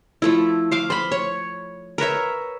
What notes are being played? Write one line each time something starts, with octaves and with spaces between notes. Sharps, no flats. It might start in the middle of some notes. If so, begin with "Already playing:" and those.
F3 A3 E4
C5 F5 D6
C5 B5
C#5
A#4 B4 C#5 E5